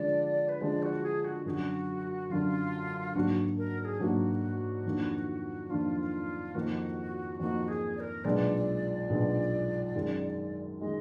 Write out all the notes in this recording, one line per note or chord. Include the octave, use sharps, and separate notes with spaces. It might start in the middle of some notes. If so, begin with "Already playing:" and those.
Already playing: D3 F3 G#3 D5
B4
D3 F3 G#3 D5
F#4
G#4
F#4
F#2 D3 F#3 F#4 G#4
F#2 D3 F#3 F4
G#2 F#3 A#3 D4 F#4
A#4
A#4
G#4
G#2 F#3 A#3 D4 F#4
F2 D#3 A#3 D4
F2 D#3 A#3 D4 F4
F2 D#3 A#3 D#4 F#4
F2 D#3 A#3 D#4 F#4
G#4
D5
A#4
B1 A#2 G#3 B3 D4 D5
B1 A#2 G#3 B3 D4
F#2 D#3 G#3
D#3 G#3 D#5